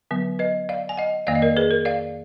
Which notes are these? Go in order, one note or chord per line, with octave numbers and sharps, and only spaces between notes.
D3 F#3 B3
B4 D#5
D5 F5
G#5
D#5 F#5
F2 D#3 A#3 D5 F5
D#5
A#4 D5
G#4 B4
A#4
D5 F5